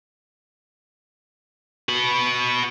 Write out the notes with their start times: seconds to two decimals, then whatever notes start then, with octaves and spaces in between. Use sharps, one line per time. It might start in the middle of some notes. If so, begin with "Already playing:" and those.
1.89 F#4 B5